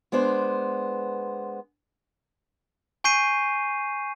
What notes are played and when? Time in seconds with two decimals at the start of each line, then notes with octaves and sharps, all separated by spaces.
0.12 G#3 B3 D4 C5
3.04 G#5 C#6 G6 C7 D#7